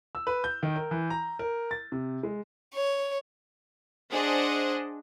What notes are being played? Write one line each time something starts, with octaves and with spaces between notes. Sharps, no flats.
E6
B4
G6
D#3
A#4
E3
A#5
A#4
A6
C3
G#3
C#5
D4 G#4 C5 D#5 F#5